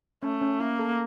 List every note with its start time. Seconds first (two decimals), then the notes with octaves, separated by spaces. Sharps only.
0.23 A3 C#4
0.41 C#4
0.60 A#3 E4
0.79 A4